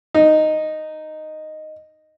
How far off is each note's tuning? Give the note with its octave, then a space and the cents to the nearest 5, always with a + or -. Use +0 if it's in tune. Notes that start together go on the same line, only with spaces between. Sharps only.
D#4 -5